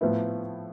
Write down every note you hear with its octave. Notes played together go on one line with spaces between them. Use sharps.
A2 F3 B3 E4